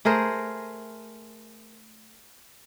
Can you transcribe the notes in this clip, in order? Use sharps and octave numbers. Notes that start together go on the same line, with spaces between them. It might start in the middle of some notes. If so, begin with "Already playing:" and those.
A3 G#4 A#4 C5